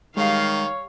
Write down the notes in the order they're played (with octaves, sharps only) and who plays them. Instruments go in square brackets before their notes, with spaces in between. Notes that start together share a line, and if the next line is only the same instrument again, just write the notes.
[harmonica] D#3 [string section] G3 F5 [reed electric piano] G#3 [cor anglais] C#5